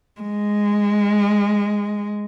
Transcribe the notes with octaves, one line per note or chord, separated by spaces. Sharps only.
G#3